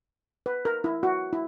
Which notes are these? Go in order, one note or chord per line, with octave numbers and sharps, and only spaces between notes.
B4
A#4
E4
F#4
E4